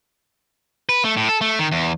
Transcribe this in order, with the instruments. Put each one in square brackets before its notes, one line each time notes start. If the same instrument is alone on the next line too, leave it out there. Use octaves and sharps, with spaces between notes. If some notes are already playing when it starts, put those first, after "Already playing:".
[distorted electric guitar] B4
A3
A2
A4
A3
D#3
E2